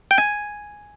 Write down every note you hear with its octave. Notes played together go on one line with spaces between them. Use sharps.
G5
G#5